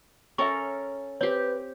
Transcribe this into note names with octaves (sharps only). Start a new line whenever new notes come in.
C#4 A4 A#4 E5 G#5 C#6
C4 G4 B4 C#5